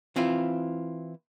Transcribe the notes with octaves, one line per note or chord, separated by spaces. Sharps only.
E3 C4 E4 F4